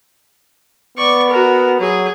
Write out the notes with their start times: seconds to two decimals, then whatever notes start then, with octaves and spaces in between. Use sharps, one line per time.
0.98 B3 D5 C#6
1.30 F#4 A#4
1.80 F#3 G#4